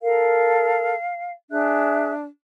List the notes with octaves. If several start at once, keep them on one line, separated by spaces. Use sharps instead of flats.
A4 A#4 F5
D4 G#4 E5 F#6